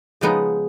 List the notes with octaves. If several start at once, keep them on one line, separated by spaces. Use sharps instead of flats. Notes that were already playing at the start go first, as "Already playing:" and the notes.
C#3 F3 G#3 B3 D#4